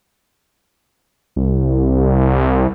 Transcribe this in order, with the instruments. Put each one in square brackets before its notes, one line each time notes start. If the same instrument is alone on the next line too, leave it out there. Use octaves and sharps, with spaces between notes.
[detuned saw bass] C2